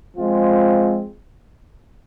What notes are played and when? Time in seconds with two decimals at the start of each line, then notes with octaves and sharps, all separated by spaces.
0.15 F3 G#3 C4 F4